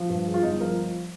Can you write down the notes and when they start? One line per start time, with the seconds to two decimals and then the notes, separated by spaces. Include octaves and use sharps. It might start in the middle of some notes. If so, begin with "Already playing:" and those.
Already playing: F3
0.09 G2
0.27 G#3
0.34 F4
0.43 G1 D#4
0.60 F3 A#4